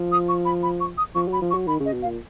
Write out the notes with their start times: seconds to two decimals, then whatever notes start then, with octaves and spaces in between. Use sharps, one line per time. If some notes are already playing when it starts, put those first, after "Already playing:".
Already playing: F3
0.11 D#6
0.28 C#6
0.45 B5
0.62 B5
0.80 C#6
0.97 D#6
1.15 F3 C#6
1.28 F#3 B5
1.42 F3
1.50 C#6
1.54 F#3
1.67 D#3 B5
1.80 C#3 D#5
1.93 B2
2.02 F5
2.06 A#2